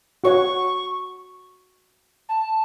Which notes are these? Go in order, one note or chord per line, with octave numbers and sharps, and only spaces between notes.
F#4 C#5 F#5 C#6
A5